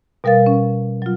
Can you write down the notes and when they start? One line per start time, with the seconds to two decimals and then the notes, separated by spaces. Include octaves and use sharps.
0.24 B2 G3 A#4 F5 A6
0.46 C#4
1.02 F#3 F4